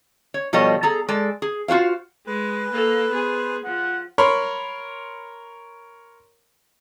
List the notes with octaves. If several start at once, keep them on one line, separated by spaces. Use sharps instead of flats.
C#5
B2 F3 G3 A4 C#5 D#5
G#4 A4 A#5
G#3 A4 D5
G#4
F4 F#4 C5 F5
G#3 B4
A#3 A4
B3 G#4 C5
F3 F#5
A#4 C#5 B5 C6